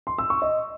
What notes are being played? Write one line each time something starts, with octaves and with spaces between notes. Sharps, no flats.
C6
E6
C#6
D#5